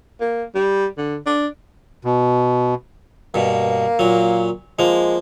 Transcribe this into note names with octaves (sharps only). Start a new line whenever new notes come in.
A#3
G3
D3
D4
B2
G2 B2 A#3
A#2 F#3
F3 G#3 A#3